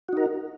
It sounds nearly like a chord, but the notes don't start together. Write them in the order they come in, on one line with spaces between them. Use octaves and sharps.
F#4 D#4 A#4